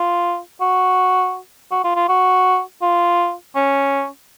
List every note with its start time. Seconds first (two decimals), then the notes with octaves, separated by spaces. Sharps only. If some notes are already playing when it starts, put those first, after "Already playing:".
Already playing: F4
0.61 F#4
1.71 F#4
1.84 F4
1.96 F4
2.09 F#4
2.82 F4
3.55 C#4